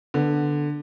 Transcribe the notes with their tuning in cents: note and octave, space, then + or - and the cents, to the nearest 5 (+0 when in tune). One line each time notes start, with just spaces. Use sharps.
D3 +0 B3 +0